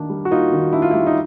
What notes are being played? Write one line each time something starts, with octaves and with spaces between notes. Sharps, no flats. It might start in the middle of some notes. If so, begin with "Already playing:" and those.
Already playing: D#3 A#3 D4
G3
F#4
A#3 D#4 F4
D#3
D4 E4
F4
G3 E4
D#4